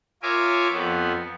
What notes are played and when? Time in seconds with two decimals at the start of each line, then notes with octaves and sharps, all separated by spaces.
0.23 F4 A#4 C#5 E5 G#5 D6
0.72 F2 B3